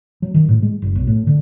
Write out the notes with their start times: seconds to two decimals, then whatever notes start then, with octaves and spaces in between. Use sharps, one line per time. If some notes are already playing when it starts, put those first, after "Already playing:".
0.22 F#3
0.34 D#3
0.48 A2
0.62 G#3
0.82 F#1
0.95 B1
1.07 A2
1.27 D3